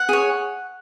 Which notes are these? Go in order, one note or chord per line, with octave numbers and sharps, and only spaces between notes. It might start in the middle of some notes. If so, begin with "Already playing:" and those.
Already playing: F#5
G#4 C#5